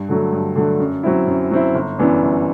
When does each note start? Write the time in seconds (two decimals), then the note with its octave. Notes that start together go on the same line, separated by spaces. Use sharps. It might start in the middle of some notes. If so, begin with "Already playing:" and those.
Already playing: G2
0.09 D3 F#3 A3
0.33 G2
0.56 D3 F#3 A3
0.80 F#2
1.03 F#3 C4 E4
1.27 F#2
1.51 F#3 C4 E4
1.74 G1
1.99 F#2 E3 B3 D4
2.22 G1